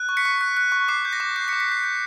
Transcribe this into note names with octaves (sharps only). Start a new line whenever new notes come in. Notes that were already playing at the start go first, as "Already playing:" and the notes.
Already playing: F#6
C#6
B6 C#7
C#6
F#6
F#6
C#6
D6 C7
G6
A#6
D6
G6 C7
D6 B6 C#7
B6
G6 C7
G6